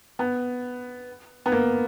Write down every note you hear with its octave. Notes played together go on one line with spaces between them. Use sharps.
B3
B3
A#3